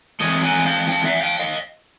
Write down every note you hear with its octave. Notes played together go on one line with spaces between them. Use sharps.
A2 E3 G#3 C4 C#5 D#5
F#5 G#5
F5 G5
F5 G5
E5 F#5
F5 G5
D#5 F5